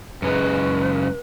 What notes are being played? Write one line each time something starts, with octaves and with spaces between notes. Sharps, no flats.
F#2 C#3 G#3 B4